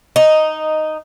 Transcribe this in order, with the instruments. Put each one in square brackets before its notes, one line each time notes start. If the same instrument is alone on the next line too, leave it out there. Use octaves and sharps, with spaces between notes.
[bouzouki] D#4